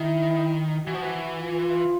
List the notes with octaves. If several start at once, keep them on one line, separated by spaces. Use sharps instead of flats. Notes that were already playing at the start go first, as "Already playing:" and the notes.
Already playing: D#3 E4
E3 F#4
F3
E3
F4